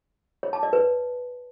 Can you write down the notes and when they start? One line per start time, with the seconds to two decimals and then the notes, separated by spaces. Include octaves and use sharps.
0.43 C#5
0.53 A5
0.63 D5
0.73 B4